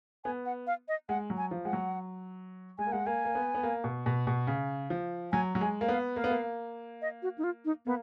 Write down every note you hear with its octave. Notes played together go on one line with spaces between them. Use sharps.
B3 G#5
F#5
F5
D#5
G#3 F#5
F#3
G#5
F3
G#3 F#5
F#3
G#3 G#5
A#3
G#3 F#5
A#3 G#5
A#3
B3
B3
A#3
B2
B2
B2
C#3
F3
F#3 G#5
F#3
G#3 G#5
A#3
B3 F5
A#3 F5
B3
A#3
D#5
F#4
D#4
F4
D#4
A#3 B3